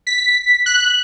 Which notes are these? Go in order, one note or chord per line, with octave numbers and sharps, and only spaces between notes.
B6
F#6